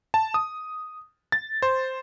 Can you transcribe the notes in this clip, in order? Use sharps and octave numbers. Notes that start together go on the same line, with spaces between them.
A5
D#6
A6
C5